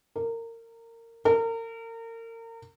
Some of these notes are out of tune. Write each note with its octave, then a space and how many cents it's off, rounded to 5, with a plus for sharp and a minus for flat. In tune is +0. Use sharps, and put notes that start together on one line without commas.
A#4 -25
A#4 -35